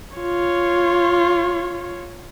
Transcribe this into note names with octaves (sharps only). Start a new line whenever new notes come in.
F4 C#5